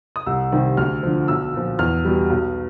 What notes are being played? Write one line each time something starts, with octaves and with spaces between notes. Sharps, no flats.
D#6
C2 E6
C3 D#3 G3
D2 F6
D3 F3
B1 E6
A#2 F3
E2 F6
B2 G3
B1